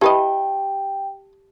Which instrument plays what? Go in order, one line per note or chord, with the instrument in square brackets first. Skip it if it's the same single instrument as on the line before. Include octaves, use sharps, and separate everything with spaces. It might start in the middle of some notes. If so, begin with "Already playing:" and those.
[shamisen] E4 B4 D#5 [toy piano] G4 A5 [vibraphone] G5